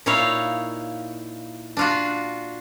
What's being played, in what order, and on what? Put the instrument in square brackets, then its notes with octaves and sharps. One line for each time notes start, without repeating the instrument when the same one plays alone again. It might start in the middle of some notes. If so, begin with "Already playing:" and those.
[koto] A#2 D#4 E4 C#5 F5
D4 F4 F#4